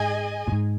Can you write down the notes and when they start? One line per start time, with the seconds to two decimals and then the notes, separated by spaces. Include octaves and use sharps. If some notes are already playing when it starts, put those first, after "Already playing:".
Already playing: G#2 G#4 D#5 G#5
0.48 A#2
0.52 G#2